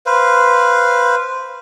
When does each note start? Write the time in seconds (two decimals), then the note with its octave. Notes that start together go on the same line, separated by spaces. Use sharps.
0.06 B4 C5 F5